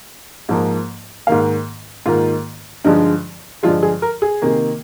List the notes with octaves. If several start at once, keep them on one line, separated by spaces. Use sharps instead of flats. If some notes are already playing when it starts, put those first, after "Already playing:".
G#2 F3 A#3
G#2 D#3 A#3 F5
G#2 D#3 A#3 F4
G2 D3 F3 G#3 D#4
G2 D3 F3 G#3 F4
G#4
A#4
G#4
C3 D#3 A#3